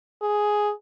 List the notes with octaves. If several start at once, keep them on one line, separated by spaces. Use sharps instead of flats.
G#4